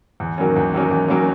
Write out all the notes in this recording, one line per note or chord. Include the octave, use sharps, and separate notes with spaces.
E2
D#3 F#3 A#3 C#4
E2
D#3 F#3 A#3 C#4
E2
D#3 F#3 A#3 C#4